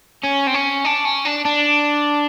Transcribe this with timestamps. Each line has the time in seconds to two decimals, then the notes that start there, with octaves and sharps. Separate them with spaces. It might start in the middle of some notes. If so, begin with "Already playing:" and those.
0.24 C#4
0.47 C4
0.54 C#4
0.85 D4
1.05 C#4
1.25 D4
1.45 D4